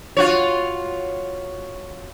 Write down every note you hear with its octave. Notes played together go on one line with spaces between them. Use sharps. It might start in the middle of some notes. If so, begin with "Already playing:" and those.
F4 F#4 C#5